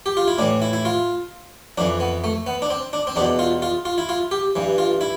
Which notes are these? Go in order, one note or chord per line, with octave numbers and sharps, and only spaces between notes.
G4
F4
E4
A2 E3 D4
E4
E4
F4
F2 E3 D4
B3
A3
B3
D4
C4
D4
C4
E2 B2 D4
F4
F4
F4
E4
F4
G4
G2 E3
F4
E4